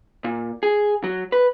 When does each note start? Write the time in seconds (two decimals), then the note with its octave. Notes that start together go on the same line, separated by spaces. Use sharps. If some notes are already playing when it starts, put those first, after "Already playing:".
0.24 A#2
0.63 G#4
1.04 F#3
1.32 B4